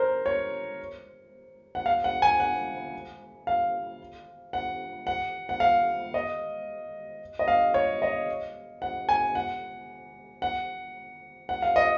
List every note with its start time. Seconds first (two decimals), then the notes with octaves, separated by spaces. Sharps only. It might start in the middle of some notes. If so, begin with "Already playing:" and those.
Already playing: A#4 C5
0.26 C#5
1.75 F#5
1.86 F5
2.04 F#5
2.22 G#5
2.40 F#5
3.47 F5
4.53 F#5
5.07 F#5
5.49 F#5
5.60 F5
6.14 D#5
7.39 D#5
7.48 F5
7.74 C#5
8.02 D#5
8.82 F#5
9.09 G#5
9.35 F#5
10.42 F#5
11.49 F#5
11.62 F5
11.76 D#5